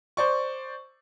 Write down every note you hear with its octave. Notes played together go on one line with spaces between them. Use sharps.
C5 D5 C#6